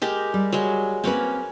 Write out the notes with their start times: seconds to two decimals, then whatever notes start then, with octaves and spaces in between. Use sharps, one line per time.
0.02 G#3 G4 A#4
0.34 G3
0.52 F#3 G#3
1.04 A#3 C4 C#4 B4